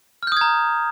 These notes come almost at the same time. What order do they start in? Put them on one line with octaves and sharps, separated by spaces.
F6 G6 D#6 G#6 A#5